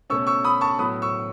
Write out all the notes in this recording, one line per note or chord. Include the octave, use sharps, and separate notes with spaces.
B2 A3 C#4 C#6 E6
C#6 E6
B5 D#6
A5 C#6
A2 F#3 B3 B5 D#6
C#6 E6